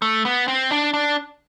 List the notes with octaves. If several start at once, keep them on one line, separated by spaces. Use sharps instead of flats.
A3
B3
C4
D4
D4